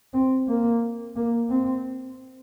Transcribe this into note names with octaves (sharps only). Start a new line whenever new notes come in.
C4
A#3
A#3
C4